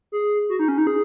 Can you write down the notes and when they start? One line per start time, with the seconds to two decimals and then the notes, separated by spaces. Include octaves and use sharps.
0.12 G#4
0.49 F#4
0.59 D#4
0.68 C#4
0.78 D#4
0.87 G#4